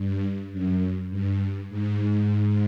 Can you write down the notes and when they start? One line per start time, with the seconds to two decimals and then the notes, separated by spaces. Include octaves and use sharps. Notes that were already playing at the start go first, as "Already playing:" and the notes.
Already playing: G2
0.52 F#2
1.11 G2
1.69 G#2